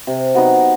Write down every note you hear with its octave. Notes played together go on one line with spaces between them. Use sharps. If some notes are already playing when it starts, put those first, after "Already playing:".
C3
F#3 B3 D#4